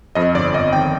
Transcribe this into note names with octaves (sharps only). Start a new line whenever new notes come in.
F2 D#5
G1 D5
G1 D#5
D#3 G5